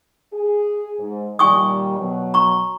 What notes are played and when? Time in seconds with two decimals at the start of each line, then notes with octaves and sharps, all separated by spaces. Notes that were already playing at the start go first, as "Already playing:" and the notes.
0.33 G#4
0.98 G#2
1.39 A#2 D#3 G3 G#5 C#6 D#6
1.99 B2 F#3
2.34 A#5 C#6